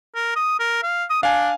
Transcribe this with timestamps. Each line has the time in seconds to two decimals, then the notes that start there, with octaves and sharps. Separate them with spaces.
0.15 A#4
0.36 D#6
0.60 A#4
0.83 F5
1.10 D#6
1.23 D4 F5 G#5